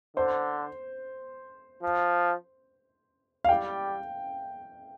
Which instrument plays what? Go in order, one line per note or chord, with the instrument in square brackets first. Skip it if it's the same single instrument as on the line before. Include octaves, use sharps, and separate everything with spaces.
[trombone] D3 [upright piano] C5
[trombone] F3
[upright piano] F5
[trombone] G3 [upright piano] G5